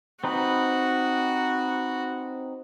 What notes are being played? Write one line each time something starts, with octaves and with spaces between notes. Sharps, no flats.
C4 D#4 F#4 B4